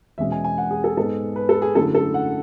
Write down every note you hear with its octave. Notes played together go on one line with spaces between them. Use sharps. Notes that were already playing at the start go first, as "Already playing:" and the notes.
E2 B2 G#3 C#4 E5
G#5
G#5
F#5
G#4
A4
G#2 G#3 B3 A4
B4
A4
G#4
F#2 D3 F#3 A3 E4 A4
A4
F#5